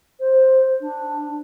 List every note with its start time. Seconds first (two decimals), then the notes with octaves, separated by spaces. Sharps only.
0.20 C5
0.80 D4